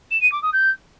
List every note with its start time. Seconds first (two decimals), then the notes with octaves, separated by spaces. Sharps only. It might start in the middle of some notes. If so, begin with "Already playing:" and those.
0.11 E7
0.21 D#7
0.32 D6
0.42 D#6
0.53 G6